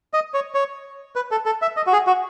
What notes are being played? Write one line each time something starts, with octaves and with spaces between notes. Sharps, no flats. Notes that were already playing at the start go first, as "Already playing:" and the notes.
D#5
C#5
C#5
B4
A4
A4
E5
D#5
F#4
G#4
F#4